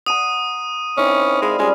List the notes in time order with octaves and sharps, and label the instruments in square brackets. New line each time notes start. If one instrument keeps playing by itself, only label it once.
[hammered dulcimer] F#5 A#5 [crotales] D#6 D#7
[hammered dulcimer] D#3 C4 E4 [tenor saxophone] C#4
[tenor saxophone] G#3 [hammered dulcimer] D5 F5 B5
[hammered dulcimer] G3 C#4 F4 [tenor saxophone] G#3